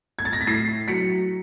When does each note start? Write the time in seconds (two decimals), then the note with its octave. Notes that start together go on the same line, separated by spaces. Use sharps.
0.19 G#6
0.25 A6
0.33 A#6
0.41 B6
0.47 A2 A#6 C7
0.88 F#3 B6 C#7